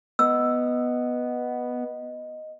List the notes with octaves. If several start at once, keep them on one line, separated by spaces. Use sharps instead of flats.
B3 D#5 E6